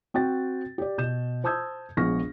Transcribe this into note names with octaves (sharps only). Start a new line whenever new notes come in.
C4 F#4 G5 A6
G4 D5
B2 G6 E7
C5 A5 D#6 E6 G6 G#6
A#1 G#3 B3 C#6 F6 A#6